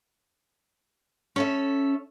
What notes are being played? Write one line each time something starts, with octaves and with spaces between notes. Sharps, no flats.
C#4 A4 E5